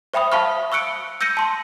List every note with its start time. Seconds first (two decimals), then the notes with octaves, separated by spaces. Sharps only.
0.14 C5 E5 G5 B5 D#6
0.32 E5 F5 A5 B5 C#6 F6
0.72 C#6 E6 F#6 C#7 D7
1.21 E6 G6 A#6 C#7 D#7
1.37 A5 C6